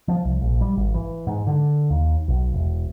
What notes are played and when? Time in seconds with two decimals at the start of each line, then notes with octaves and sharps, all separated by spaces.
0.08 F3
0.24 C2
0.41 A#1
0.61 G3
0.76 G#1
0.94 E3
1.27 G#2
1.47 D3
1.90 D#2
2.28 B1
2.54 E1